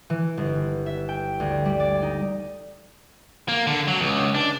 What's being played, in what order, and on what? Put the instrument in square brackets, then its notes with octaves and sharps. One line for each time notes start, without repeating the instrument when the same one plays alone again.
[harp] E3
G1
E5
G5
D2
G3
D5
D#4
[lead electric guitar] A#3
D3
F#3
C#2
D4